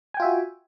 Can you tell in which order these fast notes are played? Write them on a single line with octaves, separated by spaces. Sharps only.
G#5 G5 F4 E5 F#4